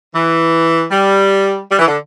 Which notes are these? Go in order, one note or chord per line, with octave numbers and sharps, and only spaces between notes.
E3
G3
G3
E3
D3